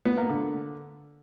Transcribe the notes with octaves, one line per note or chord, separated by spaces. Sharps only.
B3
A#3
D3